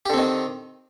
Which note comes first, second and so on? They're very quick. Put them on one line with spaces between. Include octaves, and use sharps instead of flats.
G4 D3 C4 D#3